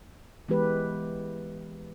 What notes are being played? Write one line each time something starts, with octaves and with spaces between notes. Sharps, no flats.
E3 G#3 B3 G4 B4